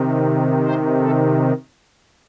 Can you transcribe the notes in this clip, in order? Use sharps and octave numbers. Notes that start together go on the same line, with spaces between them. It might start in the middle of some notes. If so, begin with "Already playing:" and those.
Already playing: C3 D#3
C5
A4